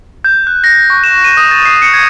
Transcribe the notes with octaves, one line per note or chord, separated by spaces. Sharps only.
G6
F#6
A#6
C#6
E7
D#7
D#6
A6
C7
C#7
G#6